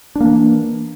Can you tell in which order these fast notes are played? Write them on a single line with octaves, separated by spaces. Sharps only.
D4 A#3 E3